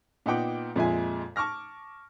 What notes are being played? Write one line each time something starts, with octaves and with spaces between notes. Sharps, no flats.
A#2 B3 D#4 F#5 G5 D6
F2 A#2 G#3 E5 G#5
A5 C#6 D6 F6 A#6